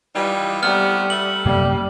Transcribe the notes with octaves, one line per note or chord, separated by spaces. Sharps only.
E3 G3 D#4 F4
C3 G3 A3 B3 F6
A3 F#7
F#2 C3 G3 A#3